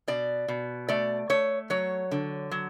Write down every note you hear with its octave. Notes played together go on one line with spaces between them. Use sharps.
B2 D5
B2
A3 D5
A3 C#5
F#3 C#5
D3
F#3